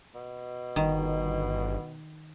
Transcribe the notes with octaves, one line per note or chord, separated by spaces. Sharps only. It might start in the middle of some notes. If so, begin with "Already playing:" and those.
B2
G1 D#3